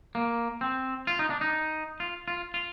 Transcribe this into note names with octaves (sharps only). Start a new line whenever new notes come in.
A#3
C4
F4
D#4
D4
D#4
F4
F4
F4